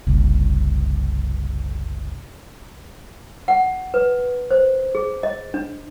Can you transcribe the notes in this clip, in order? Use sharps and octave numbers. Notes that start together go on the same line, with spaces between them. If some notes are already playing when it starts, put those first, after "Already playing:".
F#1 C2
F#5
B4
C5
G#4
D#5
D4